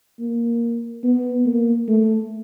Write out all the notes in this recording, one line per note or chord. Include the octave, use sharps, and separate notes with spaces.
A#3
B3
A#3
A3